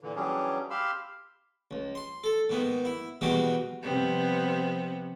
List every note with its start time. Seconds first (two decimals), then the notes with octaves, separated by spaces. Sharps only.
0.01 A#2 D3 E3
0.16 E3 F#3 G3 C#4 D4 G#4
0.70 G4 F5 B5 C6 E6
1.71 C#2
1.95 C6
2.24 A4
2.50 G#2 D#3 B3
2.85 E4
3.21 B2 D#3 E3 G3 G#3 F#4
3.83 C3 F3 G3 B3 C4